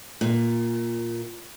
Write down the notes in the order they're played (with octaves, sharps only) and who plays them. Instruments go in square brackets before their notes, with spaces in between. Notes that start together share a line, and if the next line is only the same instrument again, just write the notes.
[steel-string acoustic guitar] A#2